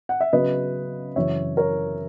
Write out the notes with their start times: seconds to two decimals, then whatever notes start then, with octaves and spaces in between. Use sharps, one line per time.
0.09 F#5
0.21 E5
0.33 C#3 F#3 B3 B4 D#5
1.16 F#2 C#3 E3 C#5 E5
1.57 A#4 C#5